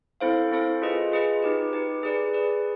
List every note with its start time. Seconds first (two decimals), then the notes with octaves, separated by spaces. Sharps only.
0.20 C4 E4 A4 C5 F5
0.51 C4 E4 A4 C5 F5
0.82 F4 G#4 B4 D#5
1.12 F4 G#4 B4 D#5
1.43 D#4 G4 B4
1.73 D#4 G4 B4
2.03 G#4 B4 D5
2.33 G#4 B4 D5